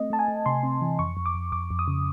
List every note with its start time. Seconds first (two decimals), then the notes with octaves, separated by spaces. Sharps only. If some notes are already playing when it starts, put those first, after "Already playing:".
Already playing: A3 C4 D#5
0.10 A3 A5
0.19 G#5
0.28 A3
0.46 C3 C6
0.63 C4
0.81 E3
0.99 F2 C#6
1.17 F2
1.26 D6
1.35 F2
1.52 F2 D6
1.71 F2
1.79 D#6
1.88 C#3